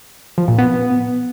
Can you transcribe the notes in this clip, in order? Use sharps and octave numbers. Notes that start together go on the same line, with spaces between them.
F3
A#2
B3